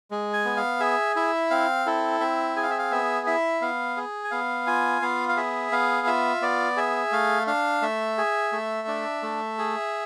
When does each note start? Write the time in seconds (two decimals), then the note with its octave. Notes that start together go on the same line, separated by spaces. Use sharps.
0.11 G#3
0.33 G#5
0.45 B3
0.57 F5
0.80 G#4 E5
1.16 E4 E5
1.50 C4 F5
1.86 E4 A4
2.20 C4 E5
2.56 G#4 G#5
2.63 F5
2.70 E5
2.78 F5
2.92 B3 E5
3.27 E4 E5
3.61 B3 F5
3.97 G#4
4.24 G#5
4.31 B3 F5
4.67 F4 G#5
5.02 B3 F5
5.29 F5
5.37 G#4 E5
5.72 B3 F5
6.07 F4 E5
6.42 B3 D5
6.77 G#4 E5
7.12 A3 F5
7.47 D4 F5
7.82 A3 E5
8.18 G#4
8.52 A3
8.88 D4
9.23 A3
9.58 G#4